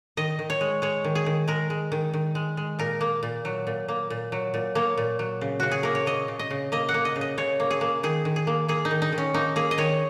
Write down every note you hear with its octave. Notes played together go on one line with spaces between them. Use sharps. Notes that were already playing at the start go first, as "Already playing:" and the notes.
D#3 D#5
D#3
C#5
G#3
G#3 C#5
D#3
G#4
D#3
G#3 A#4
G#3
D#3
D#3
G#3
G#3
A#2 A#4
A#3
A#2
F#3
A#2
A#3
A#2
F#3
A#2
A#3 C#5
A#2
F#3
C#3
C#3 F#4
G#4
A#3 A#4
C#5
A#3 D#5
C#3
D#5
C#3
A#3 D#5
F#5
A#3
D#5
C#3
D#5
C#3 C#5
A#3
G#4
A#3
D#3 G#4
D#3
G#4
A#3
A#3 G#4
D#4
D#3
D#4
D#3
C#4
A#3 D#4
A#3 G#4
D#5
D#3 C#5